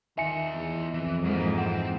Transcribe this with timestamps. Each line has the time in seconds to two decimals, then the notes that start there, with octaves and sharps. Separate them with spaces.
0.18 D#3 F4 D#5 E5 G#5 C#7
0.55 E2
0.94 F2 E3
1.25 G#2 E3 G#3 A#3 A#4
1.58 C4 F#5